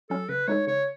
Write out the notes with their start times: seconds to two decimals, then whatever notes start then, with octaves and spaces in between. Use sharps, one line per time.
0.10 F#3 C#4 A4
0.29 C#3 B4
0.48 G#3 D#4 A4 C#5
0.67 C#3 C#5